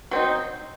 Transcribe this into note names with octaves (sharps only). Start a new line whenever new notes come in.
F#3 C4 D#4